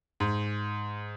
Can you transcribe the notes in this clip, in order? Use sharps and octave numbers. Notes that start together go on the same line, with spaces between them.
G#2